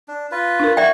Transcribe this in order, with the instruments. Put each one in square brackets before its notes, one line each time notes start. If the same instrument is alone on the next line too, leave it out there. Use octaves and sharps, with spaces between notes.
[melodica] D4
F4 B4
[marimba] D4 A#4
[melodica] F#4 C#6 [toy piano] D5 E5 G5